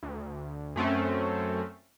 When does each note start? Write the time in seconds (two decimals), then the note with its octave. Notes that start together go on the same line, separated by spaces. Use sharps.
0.03 D2
0.76 F#2 A3 C4 C#4